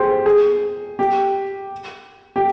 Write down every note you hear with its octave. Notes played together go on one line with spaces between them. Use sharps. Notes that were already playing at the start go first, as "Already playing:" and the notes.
Already playing: G4 G#4 C5
G#4
G4
G4